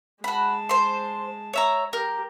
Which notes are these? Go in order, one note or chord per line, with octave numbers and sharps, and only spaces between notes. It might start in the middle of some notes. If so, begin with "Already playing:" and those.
G#3 F#4 A5 B5
C5 C6
C#5 E5 A#5
G4 A#4